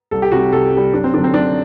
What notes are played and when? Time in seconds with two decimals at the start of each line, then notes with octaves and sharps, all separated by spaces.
0.11 C2 A4
0.22 G4
0.32 C3 G3 F#4
0.53 C2 A4
0.72 C3 G3
0.94 F#2 D4
1.04 C4
1.14 D3 F#3 D4
1.24 C4
1.34 F#2 D4